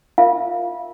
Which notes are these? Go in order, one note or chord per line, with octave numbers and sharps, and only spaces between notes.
F4 A#4 E5 F5